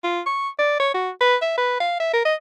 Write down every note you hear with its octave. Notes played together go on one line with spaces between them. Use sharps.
F4
C#6
D5
C#5
F#4
B4
E5
B4
F5
E5
A#4
D#5